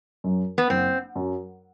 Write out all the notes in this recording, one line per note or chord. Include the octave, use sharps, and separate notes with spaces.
F#2 F#3
B3
F#1 C4
F#2 F#3